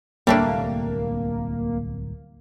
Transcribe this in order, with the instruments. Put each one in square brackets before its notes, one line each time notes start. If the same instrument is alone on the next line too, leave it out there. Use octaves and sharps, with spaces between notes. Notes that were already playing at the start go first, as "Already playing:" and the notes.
[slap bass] D1 C2 [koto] G3 A3 D4 [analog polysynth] A#3